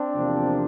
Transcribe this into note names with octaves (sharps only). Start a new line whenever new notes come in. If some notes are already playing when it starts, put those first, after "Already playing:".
Already playing: C4 D4
E2 C3 F3 A#3